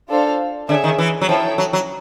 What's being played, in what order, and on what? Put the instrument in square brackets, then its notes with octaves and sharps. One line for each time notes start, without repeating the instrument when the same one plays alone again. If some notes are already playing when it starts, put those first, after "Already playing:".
[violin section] D4 F4 A4 C5 F5
[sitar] D3 [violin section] G#4 C#5 E5
[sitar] D#3
E3
F#3
[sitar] F3 [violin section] E4 A4 C#5 E5 G5
[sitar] F#3
F#3